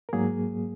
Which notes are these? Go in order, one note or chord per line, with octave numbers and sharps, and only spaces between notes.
A#4
G#2 F#3 A#3 G#4